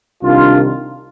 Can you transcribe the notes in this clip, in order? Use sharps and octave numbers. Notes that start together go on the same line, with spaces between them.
C2 C3 D#3 D4 F4